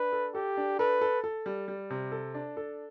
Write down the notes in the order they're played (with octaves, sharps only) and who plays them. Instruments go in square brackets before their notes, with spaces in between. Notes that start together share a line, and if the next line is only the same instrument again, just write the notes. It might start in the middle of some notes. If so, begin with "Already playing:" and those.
Already playing: [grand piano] D4 [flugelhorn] B4
[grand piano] A4
[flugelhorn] G4 [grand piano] A4
[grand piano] D4
[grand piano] A4 [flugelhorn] B4
[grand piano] A4
A4
G3
G3
C3
A4
D4
A4